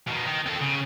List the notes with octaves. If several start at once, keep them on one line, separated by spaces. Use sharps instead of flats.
B2 D#3
D#3
C4 A4
C#3